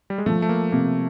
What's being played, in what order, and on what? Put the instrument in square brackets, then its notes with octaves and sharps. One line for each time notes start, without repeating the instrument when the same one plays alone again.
[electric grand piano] G3
G#3
[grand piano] F3 [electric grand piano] A3
[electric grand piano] A3
A#3
[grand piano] C3 [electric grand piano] A#3